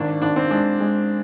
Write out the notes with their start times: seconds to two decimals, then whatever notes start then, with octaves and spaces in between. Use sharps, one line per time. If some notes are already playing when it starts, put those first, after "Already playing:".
Already playing: G#1 D4
0.22 G#1 D4
0.36 C4
0.51 G#3 D4
0.80 G#3